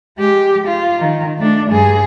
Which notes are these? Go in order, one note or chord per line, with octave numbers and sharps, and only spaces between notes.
G#3 G4
F4
D#3
A3 D4
G2 G#4